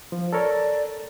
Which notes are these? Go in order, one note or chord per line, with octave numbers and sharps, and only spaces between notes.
F3
A4 A#4 C#5 D5